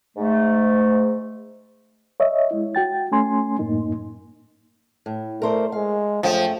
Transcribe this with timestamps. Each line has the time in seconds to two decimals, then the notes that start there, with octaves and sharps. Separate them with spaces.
0.16 G#2 A3
2.20 C#5 D#5 E5
2.51 G#3 E4
2.75 F#4 G5 A6
3.12 A3 C#4 G#5 C6
3.59 F#2 A2 A#3 D#4
5.06 A2
5.42 A3 A#4 C5 D5
5.72 G#3 F5
6.23 F#2 F3 A3 G5